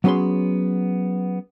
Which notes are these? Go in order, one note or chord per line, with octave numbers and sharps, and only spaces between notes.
F#3 B3 C#4 G#4 B4 C6